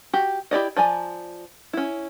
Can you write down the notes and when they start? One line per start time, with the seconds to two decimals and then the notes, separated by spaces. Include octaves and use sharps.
0.13 F#4 G4
0.51 E4 G4 D5 D#5
0.76 F3 D5 G#5 A#5
1.73 C#4 E4